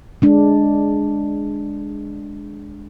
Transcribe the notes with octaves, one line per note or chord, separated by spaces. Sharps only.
G#3 D4